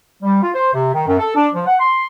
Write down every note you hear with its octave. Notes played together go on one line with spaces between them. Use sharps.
G3
F4
C5
C3
D#3
F#2
A4
D4
F3
F#5
C6